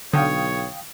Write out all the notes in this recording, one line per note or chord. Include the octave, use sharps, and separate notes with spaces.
B1 D3 C#5 F5 G5 D#6